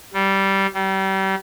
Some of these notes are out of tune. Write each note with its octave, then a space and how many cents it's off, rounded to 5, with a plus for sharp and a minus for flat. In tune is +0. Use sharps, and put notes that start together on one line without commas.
G3 -15
G3 -35